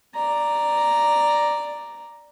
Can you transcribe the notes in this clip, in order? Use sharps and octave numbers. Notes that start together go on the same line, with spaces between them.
D5 A#5